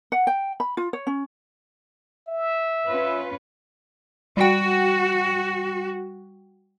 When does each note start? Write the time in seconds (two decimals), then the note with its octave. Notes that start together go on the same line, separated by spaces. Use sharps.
0.12 F#5
0.27 G5
0.60 B5
0.77 F4
0.93 C#5
1.07 C#4
2.28 E5
2.86 C#4 F4 B4
4.37 G3 F#4 G5